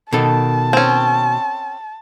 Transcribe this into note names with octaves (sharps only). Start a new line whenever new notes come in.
B2 D#3 A4 A5
C4 C#4